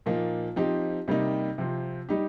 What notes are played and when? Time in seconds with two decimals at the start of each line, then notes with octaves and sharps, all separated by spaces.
0.06 A#2 F3 A#3 D#4
0.56 F3 C4 D#4 G4
1.08 C3 G3 A#3 D#4
1.58 C3 F3 C4
2.09 G3 D#4 G4